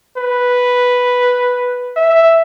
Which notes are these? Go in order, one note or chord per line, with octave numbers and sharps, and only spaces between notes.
B4
E5